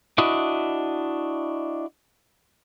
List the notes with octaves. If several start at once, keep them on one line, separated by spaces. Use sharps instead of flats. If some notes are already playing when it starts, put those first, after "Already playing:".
D4 E4 F#4 D#5